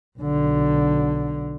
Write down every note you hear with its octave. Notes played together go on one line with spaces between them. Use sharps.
B1 D3